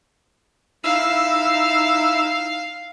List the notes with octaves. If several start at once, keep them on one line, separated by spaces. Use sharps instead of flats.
D#4 E4 F5 E6